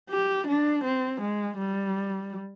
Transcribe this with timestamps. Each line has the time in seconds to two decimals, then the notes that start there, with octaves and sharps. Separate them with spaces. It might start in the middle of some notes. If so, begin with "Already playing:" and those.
0.10 G4
0.47 D4
0.84 C4
1.21 G#3
1.57 G3